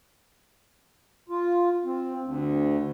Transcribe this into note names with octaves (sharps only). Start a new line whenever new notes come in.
F4
C4
D2